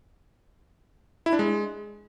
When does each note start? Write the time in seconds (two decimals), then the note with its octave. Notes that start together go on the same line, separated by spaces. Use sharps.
1.26 E4
1.33 D4
1.39 G#3